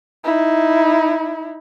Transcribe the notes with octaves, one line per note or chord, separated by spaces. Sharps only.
D#4 E4